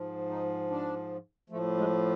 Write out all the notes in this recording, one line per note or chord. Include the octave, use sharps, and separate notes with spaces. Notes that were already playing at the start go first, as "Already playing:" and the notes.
Already playing: G#2 F3
D#4
D4
A2 F3 A3
G#3